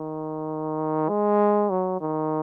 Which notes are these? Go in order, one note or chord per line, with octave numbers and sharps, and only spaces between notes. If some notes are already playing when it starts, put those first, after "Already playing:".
Already playing: D#3
G#3
F#3
D#3